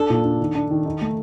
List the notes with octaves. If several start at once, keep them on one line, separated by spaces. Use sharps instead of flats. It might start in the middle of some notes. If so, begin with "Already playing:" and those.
Already playing: D4 A4
A#2
D4
D#3
D4
D#3
D#4
A3